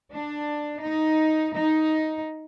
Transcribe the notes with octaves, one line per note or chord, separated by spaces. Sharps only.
D4
D#4
D#4